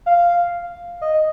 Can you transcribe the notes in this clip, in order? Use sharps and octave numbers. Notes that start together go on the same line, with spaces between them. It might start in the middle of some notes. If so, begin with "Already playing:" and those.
F5
D#5